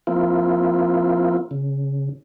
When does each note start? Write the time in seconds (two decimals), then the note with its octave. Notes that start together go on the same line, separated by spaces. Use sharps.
0.07 F3 A#3 C4 E4 F4
1.51 C#3